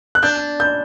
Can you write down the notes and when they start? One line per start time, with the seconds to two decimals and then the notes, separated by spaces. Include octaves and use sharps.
0.15 F#6
0.22 D4 G6
0.60 G6